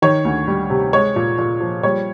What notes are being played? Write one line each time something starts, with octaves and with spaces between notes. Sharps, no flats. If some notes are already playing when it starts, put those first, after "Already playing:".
D#3 C#5
D2
G3
C3
G#3 C#5
A#2
A#2
F3
G3 C#5